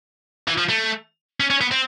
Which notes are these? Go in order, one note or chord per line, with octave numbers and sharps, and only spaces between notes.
E3
F3
A3
C#4
C#4
B3
C4